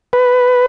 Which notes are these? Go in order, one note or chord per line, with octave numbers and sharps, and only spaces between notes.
B4